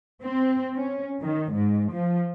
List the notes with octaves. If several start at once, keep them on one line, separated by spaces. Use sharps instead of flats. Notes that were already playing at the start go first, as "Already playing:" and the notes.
C4
C#4
D#3
G#2
F3